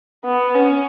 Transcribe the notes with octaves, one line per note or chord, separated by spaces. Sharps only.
B3
C#4